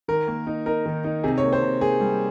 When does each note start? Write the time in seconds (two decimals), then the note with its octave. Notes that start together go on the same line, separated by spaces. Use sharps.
0.08 D#3 A#4
0.27 A#3
0.47 D#4
0.66 D#4 A#4
0.86 D#3
1.04 D#4
1.24 C3 G#4
1.38 C#5
1.43 A#3
1.53 C5
1.62 C3
1.81 A#3 G#4
2.00 G3